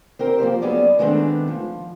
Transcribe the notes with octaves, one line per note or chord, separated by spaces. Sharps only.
C4 G4 A#4
F3 A#3 G4 C5
F#3 B3 C#4 G#4 D5
D#3 G#3 A3 B3 C4 D4
F3